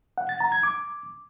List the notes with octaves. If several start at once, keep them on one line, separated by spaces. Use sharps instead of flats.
F#5
A6
A#5
G#6
D6